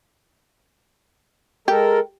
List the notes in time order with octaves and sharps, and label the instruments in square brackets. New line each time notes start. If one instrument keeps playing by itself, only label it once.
[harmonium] G#3 A4 A#4 [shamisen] G4